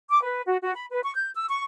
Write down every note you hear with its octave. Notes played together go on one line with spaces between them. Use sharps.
D6
B4
F#4
F#4
B5
B4
C#6
G6
E6
C#6